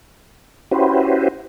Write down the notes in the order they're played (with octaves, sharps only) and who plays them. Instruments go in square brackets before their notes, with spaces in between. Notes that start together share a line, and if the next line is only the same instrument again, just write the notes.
[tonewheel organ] C#4 E4 F#4 G4 B4 C5